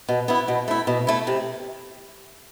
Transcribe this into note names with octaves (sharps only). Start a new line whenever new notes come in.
B2
B3 E4
B2
A3 E4
B2
A3 E4
C3